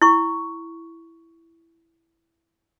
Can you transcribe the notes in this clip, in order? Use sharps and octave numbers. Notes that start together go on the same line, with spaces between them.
E4 C#6